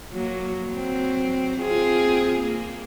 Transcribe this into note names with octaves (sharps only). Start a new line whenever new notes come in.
F#3 A#3
F#3 C4
C4 F4 G#4
A#3